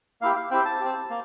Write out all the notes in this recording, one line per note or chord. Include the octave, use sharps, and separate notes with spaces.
A#3 E4 G4 F5
F5
C4 E4 G4 G5
A5
C4 G4
A#3